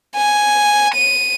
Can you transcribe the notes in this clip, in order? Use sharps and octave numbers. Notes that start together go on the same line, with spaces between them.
G#5
D#7